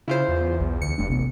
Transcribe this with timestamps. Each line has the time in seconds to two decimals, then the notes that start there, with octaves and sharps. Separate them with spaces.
0.08 C#3 E4 F4 C5
0.28 E2
0.60 B1
0.82 D2 C#7
0.98 F1 G2 A3 D4
1.10 A1 C3 B3